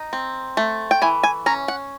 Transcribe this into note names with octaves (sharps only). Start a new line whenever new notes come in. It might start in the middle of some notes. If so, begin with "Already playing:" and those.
Already playing: D#4
C4
A3
G5
E3 G#5
G#5
C#4 A#5
F#5